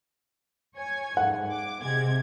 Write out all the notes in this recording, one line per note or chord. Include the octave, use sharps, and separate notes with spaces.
C#5 G#5 G#6
G#2 F#5
D6
C3 G#3 G#6